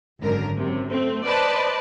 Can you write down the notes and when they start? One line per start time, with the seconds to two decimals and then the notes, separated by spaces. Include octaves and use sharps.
0.20 G#1 F#2 D3 A#4
0.58 F#2 C3
0.90 A3 C4
1.24 B4 C5 D5 D#5 A5 B5